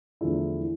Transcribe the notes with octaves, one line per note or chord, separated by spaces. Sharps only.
E2 D3 F3 A3 E4
E3